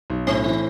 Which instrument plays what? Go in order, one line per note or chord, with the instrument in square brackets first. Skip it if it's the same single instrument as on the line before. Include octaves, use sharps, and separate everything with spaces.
[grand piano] B1
[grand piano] A2 [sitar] C4
[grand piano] E3